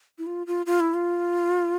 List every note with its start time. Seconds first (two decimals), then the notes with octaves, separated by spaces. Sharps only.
0.18 E4
0.26 F4
0.47 F4
0.66 F4
0.80 E4
0.94 F4